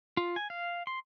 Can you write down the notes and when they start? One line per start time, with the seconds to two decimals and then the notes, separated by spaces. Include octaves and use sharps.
0.17 F4
0.36 G#5
0.50 F5
0.87 C6